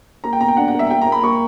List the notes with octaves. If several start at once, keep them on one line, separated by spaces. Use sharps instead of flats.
A#3 A#5
G5
B2 A#5
G5
D4 F#5
F#5
A#3
E5
A#3 G5
A#3 A#5
B5
A#3 C#6